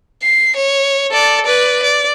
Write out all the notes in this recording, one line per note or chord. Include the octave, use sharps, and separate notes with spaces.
C7
C#5
A4 D5
B4 D5
D5